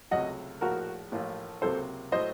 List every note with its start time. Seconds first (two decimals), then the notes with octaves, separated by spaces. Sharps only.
0.11 C#2 C3 F#3 A3 D#5 F#5
0.61 A#1 A2 F3 F#4 A#4
1.12 A1 A2 F3 A#3 F4
1.61 C#2 C3 F#3 A#3 A4 C5
2.12 A2 F#3 A3 C5 D#5